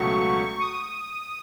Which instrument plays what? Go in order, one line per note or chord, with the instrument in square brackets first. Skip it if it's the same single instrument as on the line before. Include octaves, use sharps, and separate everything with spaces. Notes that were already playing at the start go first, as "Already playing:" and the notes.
Already playing: [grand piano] C#2 B2 F#3 A3 [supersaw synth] C#6
[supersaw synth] D#6